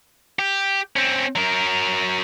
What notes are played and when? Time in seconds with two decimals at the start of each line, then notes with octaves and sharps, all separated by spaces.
0.39 G4
0.96 C4 C#4
1.36 F#3 A#4